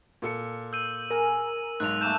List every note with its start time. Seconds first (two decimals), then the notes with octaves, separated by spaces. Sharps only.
0.22 A#2 A4 C#7
0.73 E6 G6 D#7
1.11 G#4 A#4
1.80 B1 G#2 F#6 F7
2.01 A3 A#3 A4 G6 E7